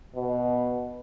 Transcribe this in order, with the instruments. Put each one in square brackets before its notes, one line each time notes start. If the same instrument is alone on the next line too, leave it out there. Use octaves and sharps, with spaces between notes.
[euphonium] B2